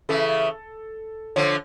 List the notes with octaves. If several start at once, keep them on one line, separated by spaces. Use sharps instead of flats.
C#3 E3 A4
D3 F3 C#5